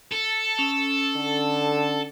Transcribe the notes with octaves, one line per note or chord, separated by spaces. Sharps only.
A4
C#4
D3